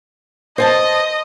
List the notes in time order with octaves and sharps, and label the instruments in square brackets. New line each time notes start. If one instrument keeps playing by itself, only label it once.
[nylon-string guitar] C5 G#5 A5 [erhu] D#5